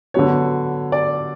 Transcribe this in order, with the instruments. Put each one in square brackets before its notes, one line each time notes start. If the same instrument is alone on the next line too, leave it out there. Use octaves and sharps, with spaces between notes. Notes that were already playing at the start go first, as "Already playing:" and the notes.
[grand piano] D3 F#3 B3 C#5
D5